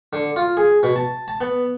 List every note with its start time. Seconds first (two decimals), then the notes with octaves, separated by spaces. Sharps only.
0.13 D3
0.36 F4
0.57 G#4
0.83 B2
0.96 A5
1.28 A5
1.41 B3